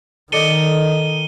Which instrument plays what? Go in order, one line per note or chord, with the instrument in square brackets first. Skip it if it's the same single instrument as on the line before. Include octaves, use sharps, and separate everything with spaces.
[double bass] D#3 [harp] A4 D5 D#5 [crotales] C#7 D#7 G7